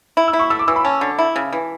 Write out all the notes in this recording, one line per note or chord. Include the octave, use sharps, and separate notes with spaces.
E4
E6
E4
C#6
A3 E6
D6
E3 E6
B5
C#4 A5
D3
E4
C#3
E3